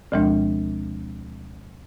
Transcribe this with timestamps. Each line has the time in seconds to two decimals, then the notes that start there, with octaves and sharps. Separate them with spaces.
0.12 D2 B2 F3 G#3 D4